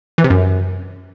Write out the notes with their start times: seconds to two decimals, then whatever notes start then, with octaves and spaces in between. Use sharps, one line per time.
0.18 E3
0.24 C3
0.30 F#2